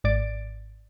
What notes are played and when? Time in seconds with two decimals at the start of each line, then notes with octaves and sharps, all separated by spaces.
0.04 G#1 G#2 D5 A6 D7